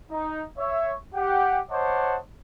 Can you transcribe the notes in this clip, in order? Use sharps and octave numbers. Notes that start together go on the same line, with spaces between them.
D#4
C#5 E5
G4 F#5
C5 C#5 D#5 F#5 A5 D6